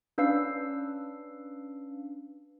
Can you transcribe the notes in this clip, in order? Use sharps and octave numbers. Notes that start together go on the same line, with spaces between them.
C#4 D4 B4 F5 E6 C7